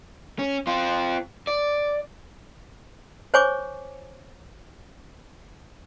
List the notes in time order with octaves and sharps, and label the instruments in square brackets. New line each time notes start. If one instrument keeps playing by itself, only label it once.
[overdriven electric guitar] C#4
C4 F4
D5
[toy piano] C5 C#5 G#5 C#6 D6